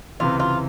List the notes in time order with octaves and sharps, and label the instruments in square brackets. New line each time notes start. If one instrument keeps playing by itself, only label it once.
[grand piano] C#2 C3 E3 [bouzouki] F4
[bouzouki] F4